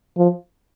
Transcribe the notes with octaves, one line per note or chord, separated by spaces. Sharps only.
F3